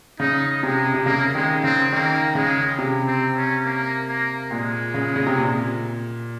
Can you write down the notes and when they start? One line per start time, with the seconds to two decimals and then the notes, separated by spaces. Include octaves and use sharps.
0.20 C#3 D#4
0.63 C3 G#3
0.94 C3
1.06 C#3 A#3
1.35 D#3 G#3
1.64 C#3 C4
1.93 D#3 A#3
2.35 C#3 G#3
2.78 C3
3.07 C4
3.37 C#4
3.65 A#3
4.08 A#3
4.51 A#2 G#3
4.94 C#3
5.16 C#3
5.27 C3
5.38 A#2